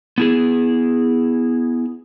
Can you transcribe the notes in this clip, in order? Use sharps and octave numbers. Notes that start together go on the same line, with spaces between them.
B3 E4 G#4